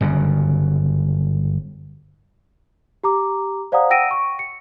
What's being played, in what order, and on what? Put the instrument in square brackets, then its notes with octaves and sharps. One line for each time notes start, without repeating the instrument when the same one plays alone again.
[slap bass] G1 F#2 C#3
[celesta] G4 A#5 D6
C5 D5 F5 F#5 A#5 D#6
F#5 G5 E6 A#6 D7 D#7
C#6
C#7